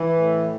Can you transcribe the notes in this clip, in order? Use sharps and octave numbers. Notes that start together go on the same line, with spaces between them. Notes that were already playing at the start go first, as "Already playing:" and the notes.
Already playing: E3
A2